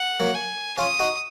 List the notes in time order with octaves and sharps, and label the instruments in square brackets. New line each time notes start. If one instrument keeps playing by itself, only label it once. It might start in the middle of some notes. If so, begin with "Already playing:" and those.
Already playing: [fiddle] F#5
[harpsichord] F#3 A#3
[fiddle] G#5
[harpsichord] C#4 F4 [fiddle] D#6
[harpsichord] D#4 F#4